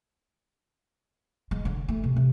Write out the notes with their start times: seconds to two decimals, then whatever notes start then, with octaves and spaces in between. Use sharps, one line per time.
1.51 G#3
1.65 D3
1.88 A3
2.04 C3
2.16 C3